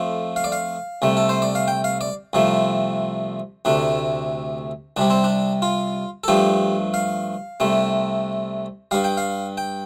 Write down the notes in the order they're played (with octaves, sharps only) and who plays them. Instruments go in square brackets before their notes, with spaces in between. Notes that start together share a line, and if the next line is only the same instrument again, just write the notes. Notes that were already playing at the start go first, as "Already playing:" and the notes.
Already playing: [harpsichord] F2 F3 A3
F5
D5
F5
C2 C3 A3
A4
C5
D5
F5
G5
F5
D5
C2 C3 F3 A3
D2 C3 A3 D4
C2 C3 G3 D4
C4
D4
F4
A4
G2 F3 A3 G4
F5
C2 C3 A3
G2 G3 F5
G5
F5
G5